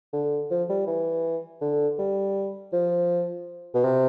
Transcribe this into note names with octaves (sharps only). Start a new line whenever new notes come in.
D3
F3
G3
E3
D3
G3
F3
B2
C3